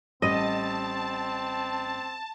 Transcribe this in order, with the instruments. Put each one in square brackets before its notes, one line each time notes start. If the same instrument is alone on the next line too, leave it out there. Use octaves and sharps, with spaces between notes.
[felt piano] A1 G3 D#7 [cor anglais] C4 [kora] D#5 [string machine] A5